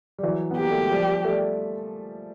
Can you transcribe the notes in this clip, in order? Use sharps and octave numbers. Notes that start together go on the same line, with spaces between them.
G3
E3 F#3
B3
A#3 G4
A3
G#3
F3 G3
G3 A3